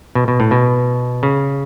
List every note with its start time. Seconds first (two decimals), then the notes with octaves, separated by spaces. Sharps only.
0.15 B2
0.28 B2
0.40 A2
0.51 B2
1.23 C#3